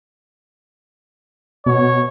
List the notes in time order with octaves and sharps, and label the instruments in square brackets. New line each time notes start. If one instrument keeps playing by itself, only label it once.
[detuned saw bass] B2 [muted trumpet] C#5